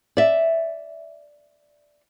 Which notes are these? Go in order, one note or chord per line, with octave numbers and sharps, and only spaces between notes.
D5 E5